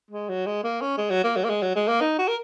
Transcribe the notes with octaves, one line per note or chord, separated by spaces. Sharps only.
G#3
F#3
G#3
A#3
C#4
G#3
F#3
A#3
F#3
A#3
G#3
F#3
G#3
A#3
D#4
F#4
A#4